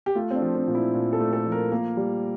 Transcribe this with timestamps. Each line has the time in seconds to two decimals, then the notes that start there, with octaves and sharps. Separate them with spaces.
0.06 G4
0.15 A3 F4
0.31 C4
0.35 D4
0.42 F3
0.55 C4
0.67 A#2
0.75 E4
0.94 A#2
1.13 A4
1.20 A3
1.33 A4
1.46 F3
1.52 A#4
1.72 A#3 A#4
1.97 G3